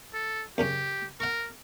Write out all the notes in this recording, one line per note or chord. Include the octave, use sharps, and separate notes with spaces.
A4
F#2 C#3 C#4 G4
A#4 F#5 C#6